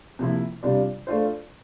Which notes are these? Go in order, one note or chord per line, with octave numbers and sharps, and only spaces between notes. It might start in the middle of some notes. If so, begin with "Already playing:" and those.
C3 F3 A#3 E4
C3 G3 D4 F4
A3 D4 F4 C5